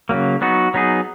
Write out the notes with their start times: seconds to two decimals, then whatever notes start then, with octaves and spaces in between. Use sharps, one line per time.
0.09 C#3 F#3 A#3
0.41 F#3 B3 D#4 F#4
0.74 F#3 B3 D#4 G#4